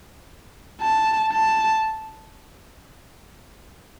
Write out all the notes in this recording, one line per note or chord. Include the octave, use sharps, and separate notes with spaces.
A5
A5